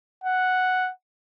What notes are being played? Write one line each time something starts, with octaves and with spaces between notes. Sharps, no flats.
F#5